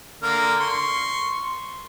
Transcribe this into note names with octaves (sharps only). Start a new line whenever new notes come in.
D3 A#3 F6
C6 C#6